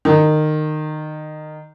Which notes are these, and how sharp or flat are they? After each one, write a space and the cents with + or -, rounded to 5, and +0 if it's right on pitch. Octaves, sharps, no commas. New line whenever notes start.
D#3 -20